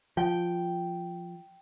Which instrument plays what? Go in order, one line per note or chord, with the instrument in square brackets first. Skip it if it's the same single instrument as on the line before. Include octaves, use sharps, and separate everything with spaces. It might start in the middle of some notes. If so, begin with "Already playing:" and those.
[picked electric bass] F3 [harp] G5